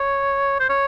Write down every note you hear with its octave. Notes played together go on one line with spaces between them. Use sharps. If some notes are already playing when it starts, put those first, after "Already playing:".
Already playing: C#5
C5
C#5